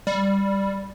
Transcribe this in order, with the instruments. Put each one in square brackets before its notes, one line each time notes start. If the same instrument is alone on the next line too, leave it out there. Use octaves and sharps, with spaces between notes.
[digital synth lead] G3